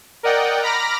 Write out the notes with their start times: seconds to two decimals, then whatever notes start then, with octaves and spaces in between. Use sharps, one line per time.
0.23 A#4 D5 D#5 F#5 G5
0.63 A#5 B5 D6 F6 A#6